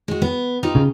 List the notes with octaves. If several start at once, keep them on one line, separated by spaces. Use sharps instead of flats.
G#3 F#4
B3
D#4 F4 G4
C#3